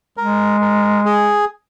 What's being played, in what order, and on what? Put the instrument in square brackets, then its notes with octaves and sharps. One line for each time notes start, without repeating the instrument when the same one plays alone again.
[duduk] G#3 [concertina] A#4
[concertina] A#4
G#4